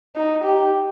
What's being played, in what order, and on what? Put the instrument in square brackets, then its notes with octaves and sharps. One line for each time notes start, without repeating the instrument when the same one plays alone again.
[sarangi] D#4
G4